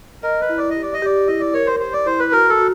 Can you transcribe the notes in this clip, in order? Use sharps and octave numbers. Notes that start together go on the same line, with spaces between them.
A#4 D#5
B4
E4
D5
D#5
G4
D5
D#5
G4 D5
E4 D#5
D5
A#4 C#5
C5
G4 C5
D5
E4 C5
B4
F#4 A#4
A4
F#4